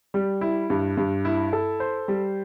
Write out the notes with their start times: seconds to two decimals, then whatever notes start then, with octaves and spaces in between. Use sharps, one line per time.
0.14 G3
0.41 E4
0.70 G2
0.97 G2
1.25 E4
1.53 A4
1.80 C5
2.08 G3